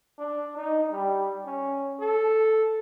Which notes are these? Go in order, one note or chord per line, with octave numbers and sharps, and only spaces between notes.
D4
D#4
G3
C#4
A4